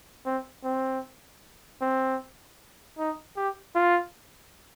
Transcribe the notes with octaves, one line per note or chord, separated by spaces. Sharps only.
C4
C4
C4
D#4
G4
F4